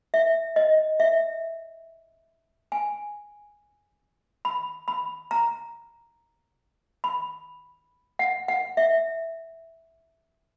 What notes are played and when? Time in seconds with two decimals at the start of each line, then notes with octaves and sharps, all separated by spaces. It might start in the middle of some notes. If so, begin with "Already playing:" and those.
0.14 E5
0.56 D#5
1.00 E5
2.72 G#5
4.45 B5
4.88 B5
5.31 A#5
7.04 B5
8.19 F#5
8.48 F#5
8.77 E5